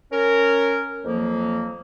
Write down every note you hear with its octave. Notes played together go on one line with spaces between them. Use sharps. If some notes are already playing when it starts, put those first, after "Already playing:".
C#4 A#4
F2 F3 F#3 A#3